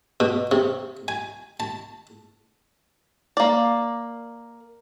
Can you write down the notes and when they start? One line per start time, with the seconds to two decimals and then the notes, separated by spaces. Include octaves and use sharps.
0.20 B2
0.52 C3
1.08 G#5
1.60 A5
3.37 A#3 D5